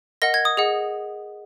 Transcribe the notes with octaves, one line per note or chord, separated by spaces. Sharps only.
A#4 D#5 F#5 A#6
G#6
D#6
G#4 D#5 F#5